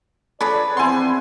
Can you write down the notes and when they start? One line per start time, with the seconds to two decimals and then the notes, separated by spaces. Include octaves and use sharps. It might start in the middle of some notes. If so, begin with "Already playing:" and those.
0.41 F3 D4 G#4 A4 B4 C#5 D5 B5
0.77 E2 F3 B3 C4 E4 C5 G#5 C6